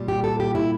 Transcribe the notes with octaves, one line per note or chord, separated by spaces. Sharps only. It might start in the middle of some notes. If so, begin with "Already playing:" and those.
Already playing: A#2 G3
G4
A4
G4
E4